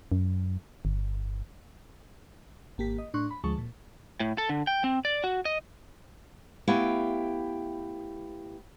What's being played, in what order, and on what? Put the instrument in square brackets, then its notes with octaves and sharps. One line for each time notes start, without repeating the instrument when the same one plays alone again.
[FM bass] F#2
G1
[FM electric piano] G#1 A#3 G4 B6
D#5
A2 D4 C6 C#6 F#6
B5
D2 F3 G#3 A5 C#6
A#2
[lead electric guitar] A2
A4
D3
G5
C4
D5
F#4
D#5
[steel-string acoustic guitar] A3 B3 E4 G4 F5 G5